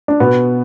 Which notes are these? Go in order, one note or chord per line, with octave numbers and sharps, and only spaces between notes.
D4
B2 B3